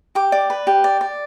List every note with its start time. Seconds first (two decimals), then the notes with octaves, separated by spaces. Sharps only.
0.15 G4 D6
0.32 D5
0.50 B4
0.67 G4
0.84 D5
1.01 D5